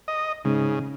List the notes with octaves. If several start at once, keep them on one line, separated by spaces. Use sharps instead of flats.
D#5
G#2 C#3